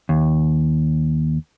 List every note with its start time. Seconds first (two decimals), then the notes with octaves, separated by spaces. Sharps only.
0.09 D#2